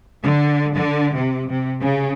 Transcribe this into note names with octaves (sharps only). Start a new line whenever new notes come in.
D3
D3
C3
C3
C#3